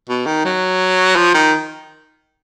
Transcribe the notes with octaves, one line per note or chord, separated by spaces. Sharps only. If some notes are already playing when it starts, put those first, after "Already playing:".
B2
D#3
F#3
F3
D#3